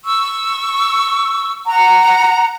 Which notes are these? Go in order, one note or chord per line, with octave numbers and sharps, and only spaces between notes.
C#6 E6
F#5 A#5